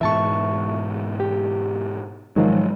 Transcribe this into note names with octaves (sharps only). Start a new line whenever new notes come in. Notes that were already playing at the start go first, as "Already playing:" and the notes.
G#2 B2 E3 E5 A5 C#6
G4
G#2 D#3 F3 F#3 G#3